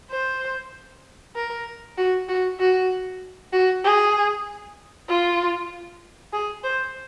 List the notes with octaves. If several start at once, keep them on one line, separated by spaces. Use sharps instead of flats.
C5
A#4
F#4
F#4
F#4
F#4
G#4
F4
G#4
C5